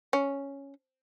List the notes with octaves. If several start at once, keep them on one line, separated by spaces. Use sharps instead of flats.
C#4